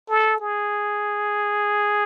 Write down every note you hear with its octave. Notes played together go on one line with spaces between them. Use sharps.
A4
G#4